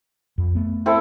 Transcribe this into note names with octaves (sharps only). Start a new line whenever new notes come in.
F2
A3 B3
C4 E4 A4